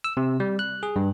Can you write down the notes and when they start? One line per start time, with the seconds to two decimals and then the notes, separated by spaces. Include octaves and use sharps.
0.04 E6
0.17 C3
0.40 G3
0.59 F#6
0.83 G#4
0.96 G2